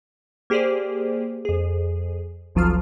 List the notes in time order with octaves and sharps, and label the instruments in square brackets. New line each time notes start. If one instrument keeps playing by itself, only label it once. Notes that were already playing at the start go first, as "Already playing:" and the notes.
[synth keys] A#3 G4 G#4 C5 D5
F2 G#4
G#1 D2 F3 F#3 F4 F6